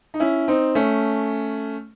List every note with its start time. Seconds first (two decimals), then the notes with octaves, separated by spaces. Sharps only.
0.14 D#4
0.20 C#4 E4
0.48 C4 D#4
0.75 A3 C#4